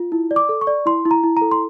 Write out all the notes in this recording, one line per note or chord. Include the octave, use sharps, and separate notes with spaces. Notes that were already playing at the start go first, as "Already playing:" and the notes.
Already playing: F4
E4
D5
D6
A4
C#6
D5
E4 C6
E4
A#5
E4
A#5
A4
C6